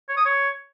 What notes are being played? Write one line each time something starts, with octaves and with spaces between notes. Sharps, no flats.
C#5
D#6
C#5